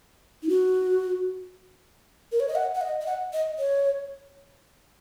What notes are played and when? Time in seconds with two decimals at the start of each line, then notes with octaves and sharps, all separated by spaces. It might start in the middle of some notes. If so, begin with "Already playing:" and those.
0.43 D#4
0.49 F#4
2.32 A#4
2.40 C#5
2.48 D#5
2.55 F#5
2.75 F#5
2.81 D#5
3.01 D#5
3.06 F#5
3.33 D#5
3.58 C#5